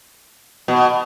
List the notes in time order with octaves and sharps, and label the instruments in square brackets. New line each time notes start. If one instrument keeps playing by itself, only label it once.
[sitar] B2